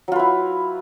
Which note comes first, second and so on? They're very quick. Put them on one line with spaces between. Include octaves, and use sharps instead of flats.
F#3 F4 B4 E4